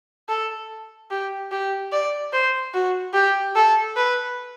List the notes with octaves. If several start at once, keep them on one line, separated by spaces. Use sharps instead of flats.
A4
G4
G4
D5
C5
F#4
G4
A4
B4